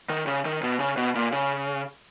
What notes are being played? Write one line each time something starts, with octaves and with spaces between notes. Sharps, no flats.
D#3
C#3
D#3
B2
C#3
B2
A#2
C#3